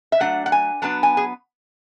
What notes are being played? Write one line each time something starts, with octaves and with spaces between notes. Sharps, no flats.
E5
F#3 A3 D4 F#5
F#5
G#5
F#3 B3 D4 A5
G#5
G#4